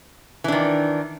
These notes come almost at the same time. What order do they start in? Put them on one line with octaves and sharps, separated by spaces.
E3 D4 D#3